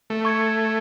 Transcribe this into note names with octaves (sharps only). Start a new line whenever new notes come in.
A3
C#6 G#6 C#7